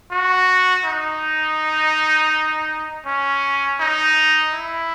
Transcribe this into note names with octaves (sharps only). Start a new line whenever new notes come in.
F#4
D#4
C#4
D#4
E4